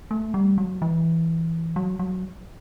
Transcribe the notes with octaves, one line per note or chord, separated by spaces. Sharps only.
A3
G3
F#3
E3
F#3
F#3